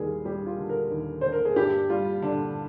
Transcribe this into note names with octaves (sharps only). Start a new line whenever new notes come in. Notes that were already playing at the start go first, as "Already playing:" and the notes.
Already playing: D#2 G3 G#4 A#4
G3 G4
F4
D3
A#4
D#2
D3 C5
A#4
G#4
G2 G4
G3 F4
D3 D4